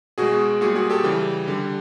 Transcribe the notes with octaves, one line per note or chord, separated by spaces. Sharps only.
B2 G#3 F#4 G#4
A#2 G3 F#4 G#4
F#4 G#4
G4 A4
C#3 E3 G3
D3 G3